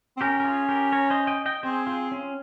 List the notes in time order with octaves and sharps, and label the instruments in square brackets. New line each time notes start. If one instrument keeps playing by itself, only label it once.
[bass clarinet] C4
[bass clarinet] C#4 [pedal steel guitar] G4 A#4
[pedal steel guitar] A#4
F4 G#4
G4 A#4
A#4 C#5
C5 D#5
D#5 G5
D#5 G5
[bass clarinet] C4 [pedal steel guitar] G#4 C5
[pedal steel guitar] F4 G#4
C#4